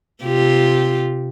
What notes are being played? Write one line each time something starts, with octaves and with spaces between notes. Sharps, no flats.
C3 F4 G4